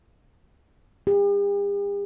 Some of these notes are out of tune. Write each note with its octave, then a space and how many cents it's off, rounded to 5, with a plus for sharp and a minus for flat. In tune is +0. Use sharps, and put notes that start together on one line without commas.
G4 +45